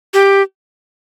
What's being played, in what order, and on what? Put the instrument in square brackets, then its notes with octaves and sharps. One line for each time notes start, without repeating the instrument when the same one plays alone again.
[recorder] G4